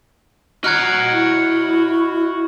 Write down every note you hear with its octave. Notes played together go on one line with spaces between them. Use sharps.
F#4 D#5 F#5 A#5 F6 F#6 G#6
E4